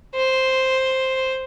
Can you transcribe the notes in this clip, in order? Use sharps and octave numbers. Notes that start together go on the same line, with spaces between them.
C5